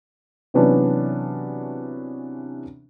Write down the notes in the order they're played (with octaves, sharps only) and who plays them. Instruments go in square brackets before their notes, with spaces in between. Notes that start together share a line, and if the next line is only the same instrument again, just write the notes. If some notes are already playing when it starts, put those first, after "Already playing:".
[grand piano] C3 E3 F#3 B3 C#4 D4